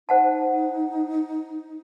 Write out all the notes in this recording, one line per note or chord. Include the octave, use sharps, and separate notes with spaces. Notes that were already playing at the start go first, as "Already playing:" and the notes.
D#4 C5 F#5 A5